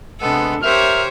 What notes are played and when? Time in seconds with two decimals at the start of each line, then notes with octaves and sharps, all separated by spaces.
0.21 C3 G#3 B3 D4 A4
0.63 G4 A#4 C5 C#5 E5 F6